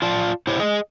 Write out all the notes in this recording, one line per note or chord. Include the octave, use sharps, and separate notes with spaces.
F4 D5 A5
E4 G4 C5 C#5
G#4 D#5